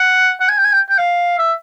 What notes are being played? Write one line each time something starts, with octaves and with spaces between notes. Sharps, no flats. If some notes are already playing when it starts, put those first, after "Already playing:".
Already playing: F#5
F#5
G#5
G5
G#5
G5
G5
F5
E5